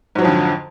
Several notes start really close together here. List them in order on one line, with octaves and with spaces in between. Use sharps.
G#2 F#3 F3 F2 D3